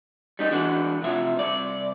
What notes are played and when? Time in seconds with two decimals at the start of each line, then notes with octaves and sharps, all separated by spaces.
0.39 G3 D#4 D#5
0.51 E3 D4 F#4
1.02 C3 F3 E5
1.37 C2 D5